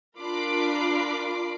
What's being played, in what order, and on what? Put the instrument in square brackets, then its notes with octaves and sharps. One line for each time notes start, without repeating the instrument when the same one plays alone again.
[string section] D4 F4 A#4 B5 D6 C7